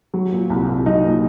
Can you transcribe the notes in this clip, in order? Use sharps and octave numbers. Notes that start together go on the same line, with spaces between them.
F#3
A#2
C2
C2
F#3 D#4
A#2